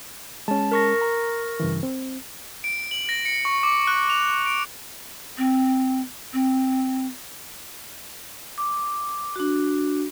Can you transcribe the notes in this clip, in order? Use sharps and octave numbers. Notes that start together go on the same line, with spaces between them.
G#3 C#4 A5
A#4 C#6 A#6
A#5
G2 C#3 E3
C4
D7
F#7
A#6
C#7
C#6
D6
F#6
F7
D7
C4
C4
D6
D4 F#4